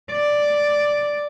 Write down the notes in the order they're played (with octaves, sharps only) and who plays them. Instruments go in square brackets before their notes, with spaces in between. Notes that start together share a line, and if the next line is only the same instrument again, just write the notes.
[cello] D5